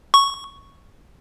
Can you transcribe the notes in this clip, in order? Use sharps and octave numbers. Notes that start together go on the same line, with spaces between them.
C#6